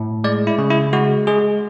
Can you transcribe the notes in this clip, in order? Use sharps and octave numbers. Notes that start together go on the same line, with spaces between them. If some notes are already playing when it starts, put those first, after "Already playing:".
Already playing: A2
G#3 D5
E4
C#3
E4
G#3 F#4
G#3 G#4